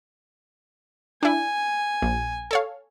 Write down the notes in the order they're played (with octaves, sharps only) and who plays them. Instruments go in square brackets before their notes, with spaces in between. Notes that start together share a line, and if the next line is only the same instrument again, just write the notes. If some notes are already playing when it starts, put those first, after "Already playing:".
[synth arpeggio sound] D4 E4 [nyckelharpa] G#5
[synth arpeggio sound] A#1
A4 C#5 F5